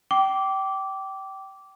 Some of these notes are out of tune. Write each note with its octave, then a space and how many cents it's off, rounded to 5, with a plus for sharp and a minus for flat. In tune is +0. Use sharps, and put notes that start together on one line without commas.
G5 -25 D6 -15